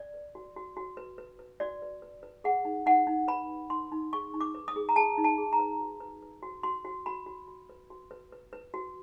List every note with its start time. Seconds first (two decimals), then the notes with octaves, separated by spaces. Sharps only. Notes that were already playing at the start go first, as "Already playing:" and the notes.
Already playing: D5
0.14 B4
0.35 F#4
0.56 F#4
0.77 F#4
0.97 B4
1.18 B4
1.39 B4
1.60 F#4 D5
1.82 B4
2.02 B4
2.23 B4
2.44 G#4 F#5
2.65 D#4
2.86 D#4 F#5
3.07 D#4
3.28 B4 B5
3.49 D#4
3.70 D#4 C6
3.92 D#4
4.13 G#4 C#6
4.34 D#4
4.41 D6
4.55 B4
4.68 D#6
4.76 G#4
4.89 A#5
4.96 G#4 A5
5.18 D#4
5.24 A5
5.38 G#4
5.53 A#5
5.60 B4
5.80 F#4
6.00 B4
6.22 B4
6.43 F#4
6.63 F#4 C6
6.85 F#4
7.06 F#4 B5
7.26 F#4
7.48 F#4
7.69 B4
7.90 F#4
8.11 B4
8.32 B4
8.53 B4
8.74 F#4